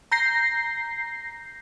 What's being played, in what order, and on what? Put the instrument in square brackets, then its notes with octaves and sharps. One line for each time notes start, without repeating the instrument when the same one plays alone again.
[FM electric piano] A#5 G6 A#6 C7